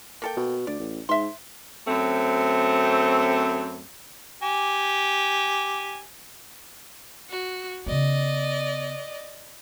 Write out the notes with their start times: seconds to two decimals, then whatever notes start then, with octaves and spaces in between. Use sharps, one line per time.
0.22 A#3 A4 G5
0.37 B2
0.67 D2 D5
0.80 A1
1.09 G#2 E5 C6
1.88 F#2 A3 C4
4.42 G4 G#5
7.30 F#4
7.86 C#3 B3 D5 D#5